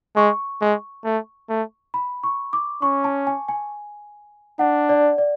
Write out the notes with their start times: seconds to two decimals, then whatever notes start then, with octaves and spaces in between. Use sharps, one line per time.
0.16 G#3 C#6
0.61 G#3
1.05 A3
1.49 A3
1.94 B5
2.24 C#6
2.53 D6
2.82 C#4 C#6
3.04 A5
3.27 G#5
3.49 G#5
4.59 D4 F#5
4.89 D5
5.18 D5